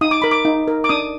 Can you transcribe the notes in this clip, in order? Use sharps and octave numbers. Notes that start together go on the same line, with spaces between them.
D#4 D#6
D6
A#4 B5
D6
D#4
A#4
D6
D4 D#6